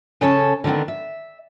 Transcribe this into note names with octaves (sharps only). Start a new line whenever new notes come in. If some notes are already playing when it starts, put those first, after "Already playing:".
C#3 C#4 A4 C#5 A5
D3 D#3 B3 C4
E5